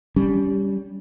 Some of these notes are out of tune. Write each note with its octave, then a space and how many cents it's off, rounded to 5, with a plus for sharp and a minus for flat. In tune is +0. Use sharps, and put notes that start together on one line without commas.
G3 +0 C#4 +30